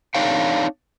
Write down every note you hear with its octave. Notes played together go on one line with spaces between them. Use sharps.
C4 D4 D#4 C#5 F5 G5